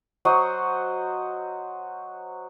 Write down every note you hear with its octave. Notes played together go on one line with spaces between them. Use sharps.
F#3 F#4 C5 D#5